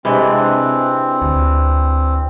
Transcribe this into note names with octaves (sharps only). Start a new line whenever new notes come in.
C3 E3 G#3 C4 D4
D2